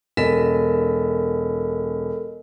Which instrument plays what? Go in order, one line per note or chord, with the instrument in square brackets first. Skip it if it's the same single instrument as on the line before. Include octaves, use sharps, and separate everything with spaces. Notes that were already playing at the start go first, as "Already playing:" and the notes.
[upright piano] E1 B6 E7 [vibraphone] A4 A#4 D#5